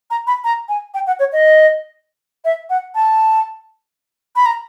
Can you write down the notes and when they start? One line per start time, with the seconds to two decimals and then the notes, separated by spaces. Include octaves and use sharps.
0.11 A#5
0.27 B5
0.44 A#5
0.69 G#5
0.94 G5
1.07 F#5
1.19 C#5
1.32 D#5
2.45 E5
2.70 F#5
2.95 A5
4.36 B5
4.46 A#5